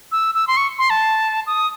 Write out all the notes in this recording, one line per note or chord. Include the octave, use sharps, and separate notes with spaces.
E6
E6
C6
C#6
C6
A5
D#6